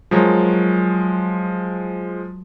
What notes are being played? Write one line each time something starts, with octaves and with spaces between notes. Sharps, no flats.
F3 F#3 G#3 A#4 C#5